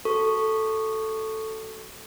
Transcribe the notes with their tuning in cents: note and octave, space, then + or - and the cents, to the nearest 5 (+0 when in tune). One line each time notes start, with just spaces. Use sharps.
F#4 +25 A4 +0 C#6 +0